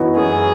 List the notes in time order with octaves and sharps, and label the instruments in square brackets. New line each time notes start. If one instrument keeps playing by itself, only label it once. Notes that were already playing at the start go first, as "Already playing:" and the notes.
Already playing: [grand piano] F#2 E3 B3 D#4 F#4
[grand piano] F#2 [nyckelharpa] G#4